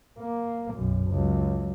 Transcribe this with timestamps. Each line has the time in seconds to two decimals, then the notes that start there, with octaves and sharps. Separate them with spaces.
0.19 A#3
0.74 B1 F#2
1.10 C#2 F#3